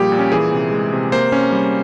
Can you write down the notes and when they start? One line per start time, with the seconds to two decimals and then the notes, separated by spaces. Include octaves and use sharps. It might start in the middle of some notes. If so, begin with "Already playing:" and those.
Already playing: A#2 F3 G3 A#3 G4 G#4
0.12 A#2
0.19 C#4
0.32 E3 G#4
0.52 C3
0.72 G#3
0.93 C3
1.12 A#3 C5
1.32 A#3 C#4
1.52 G3